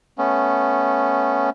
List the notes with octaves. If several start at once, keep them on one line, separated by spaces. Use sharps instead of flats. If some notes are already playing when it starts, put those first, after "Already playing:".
A3 B3 C#4